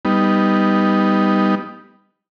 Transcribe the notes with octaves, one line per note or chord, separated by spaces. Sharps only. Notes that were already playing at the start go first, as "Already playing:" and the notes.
G3 B3 D#4